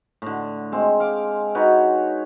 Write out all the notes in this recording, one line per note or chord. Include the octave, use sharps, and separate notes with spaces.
A2 D3
G#3 C4
F5 D6
D#4 F#4 B4 C#5